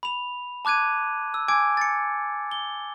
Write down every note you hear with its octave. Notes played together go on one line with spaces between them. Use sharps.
B5 F7
A5 D6 F#6 G#6 D#7
E6
G#5 D6 E6 G#6 D7
A6 C#7
G7